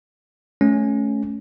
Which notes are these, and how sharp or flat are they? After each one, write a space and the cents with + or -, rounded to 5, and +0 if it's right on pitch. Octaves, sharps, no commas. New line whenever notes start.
A3 -25 C#4 +0